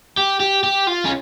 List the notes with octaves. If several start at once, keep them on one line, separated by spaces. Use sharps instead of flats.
G4
G4
G4
F4
C#4